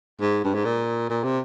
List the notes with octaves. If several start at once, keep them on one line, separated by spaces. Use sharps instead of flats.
G#2
G2
G#2
A#2
A#2
C3